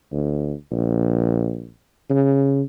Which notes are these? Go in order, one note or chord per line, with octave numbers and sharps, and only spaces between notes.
D2
A#1
C#3